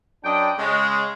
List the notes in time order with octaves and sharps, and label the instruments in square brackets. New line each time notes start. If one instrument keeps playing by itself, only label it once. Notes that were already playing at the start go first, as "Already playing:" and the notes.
[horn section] F#2 D4 D#5 G5
C#3 G#3